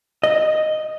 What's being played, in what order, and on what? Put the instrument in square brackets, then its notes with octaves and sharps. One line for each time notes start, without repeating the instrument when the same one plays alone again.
[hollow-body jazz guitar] D#5